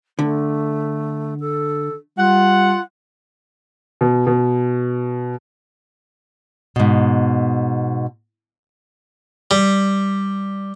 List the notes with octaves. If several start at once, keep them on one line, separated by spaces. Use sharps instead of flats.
D3 A3
A4
G3 F4 F#5
B2
B2
G#2 B2
G3